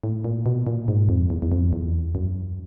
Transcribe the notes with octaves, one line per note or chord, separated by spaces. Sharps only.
A2
A#2
B2
A#2
G#2
F2
E2
E2
F2
E2
F#2